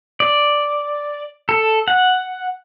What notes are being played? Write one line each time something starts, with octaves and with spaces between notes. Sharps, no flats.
D5
A4
F#5